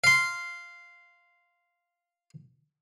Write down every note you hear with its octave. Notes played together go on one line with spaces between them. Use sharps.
F5 C6